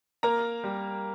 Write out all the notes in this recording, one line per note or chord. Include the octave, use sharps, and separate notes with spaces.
A#3 A#4 A#5
G3